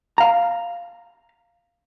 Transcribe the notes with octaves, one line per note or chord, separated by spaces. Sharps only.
F5 A#5